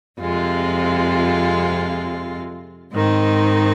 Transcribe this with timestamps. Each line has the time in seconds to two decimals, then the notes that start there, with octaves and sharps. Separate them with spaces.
0.20 F2 C3 G#3 F4
2.92 G#2 D#3 C4 D#4